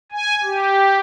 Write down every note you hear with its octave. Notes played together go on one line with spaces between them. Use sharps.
G#5
G4